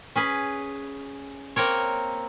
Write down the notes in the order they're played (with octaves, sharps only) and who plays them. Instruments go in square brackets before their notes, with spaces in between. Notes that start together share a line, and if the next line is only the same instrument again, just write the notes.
[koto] C#4 G#4 B4
A#3 C4 A#4 C#5